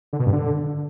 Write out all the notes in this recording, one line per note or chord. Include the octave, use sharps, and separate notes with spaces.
D3
B2
G2
D3